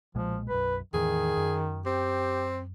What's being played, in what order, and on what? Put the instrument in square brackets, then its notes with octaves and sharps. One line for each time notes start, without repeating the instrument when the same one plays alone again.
[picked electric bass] B1 A#2 G#3 [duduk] F3
[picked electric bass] B1 F#2 [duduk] B4
[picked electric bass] E2 A2 E3 [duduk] D#3 [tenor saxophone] G#4
[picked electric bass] F#2
[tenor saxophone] C4 [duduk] G4